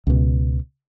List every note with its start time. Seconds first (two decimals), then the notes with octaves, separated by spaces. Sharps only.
0.07 C#2 B2